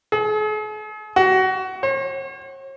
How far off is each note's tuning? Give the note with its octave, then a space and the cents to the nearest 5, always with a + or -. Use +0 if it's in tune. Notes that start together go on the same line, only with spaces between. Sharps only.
G#4 +45
F#4 +25
C#5 -45